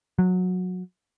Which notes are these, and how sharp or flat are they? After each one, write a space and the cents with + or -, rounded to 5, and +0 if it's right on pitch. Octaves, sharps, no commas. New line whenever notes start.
F#3 -20